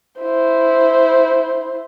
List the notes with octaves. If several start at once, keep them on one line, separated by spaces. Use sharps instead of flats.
E4 C5